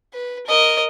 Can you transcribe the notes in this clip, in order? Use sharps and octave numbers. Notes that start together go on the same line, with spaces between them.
B4
A#4 D#5